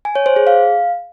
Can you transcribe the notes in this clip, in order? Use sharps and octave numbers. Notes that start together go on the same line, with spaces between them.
G#5
C#5
C5
G#4
F5